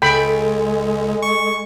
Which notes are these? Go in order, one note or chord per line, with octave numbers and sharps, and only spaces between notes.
C#2 G#3 A4 G5 G#5 B5
C#6